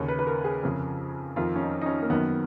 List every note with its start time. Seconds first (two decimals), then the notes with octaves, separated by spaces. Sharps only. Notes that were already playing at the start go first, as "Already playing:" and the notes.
Already playing: D#2 C#3 C#5
0.08 B4
0.19 B4
0.27 A#4
0.44 G#4
0.63 F2 C#3
1.36 F2 D#3 F4
1.56 C#4
1.62 D#4
1.81 D#4
1.86 C#4
2.02 A#3
2.10 F#2 D#3 B3